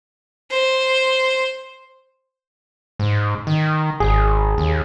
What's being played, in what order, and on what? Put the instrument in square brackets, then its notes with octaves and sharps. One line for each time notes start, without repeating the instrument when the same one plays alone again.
[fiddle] C5
[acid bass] G#2
D#3
[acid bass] G#1 [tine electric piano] G#4
[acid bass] D#2